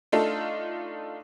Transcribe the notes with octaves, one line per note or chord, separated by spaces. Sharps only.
A3 D4 D#4 F4 A4